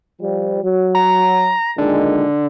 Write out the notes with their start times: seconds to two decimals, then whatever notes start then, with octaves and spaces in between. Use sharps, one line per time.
0.21 F3 G3
0.63 F#3
0.95 A#5
1.78 A#2 D3 D#3 G#3